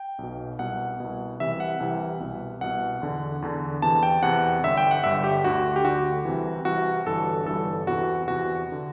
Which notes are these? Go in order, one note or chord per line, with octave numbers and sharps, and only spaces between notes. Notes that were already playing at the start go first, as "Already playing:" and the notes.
Already playing: G5
B1 B2
C2 B2 F#5
C2 B2
C2 C3 E3 E5
F#5
C2 C3 E3
C2 B2
C2 B2 F#5
E2 D3
E2 D3
E2 C3 E3 A5
G5
E2 C3 E3 F#5
G1 G2 D3 E5
G5
F#5
G1 G2 D3 E5
G4
D2 D3 F#4
G4
D2 D3 F#4
C2 C3 E3
C2 C3 E3 F#4
G1 G2 E3 A4
G1 G2 E3 A4
E2 C3 E3 F#4
E2 C3 E3 F#4
D3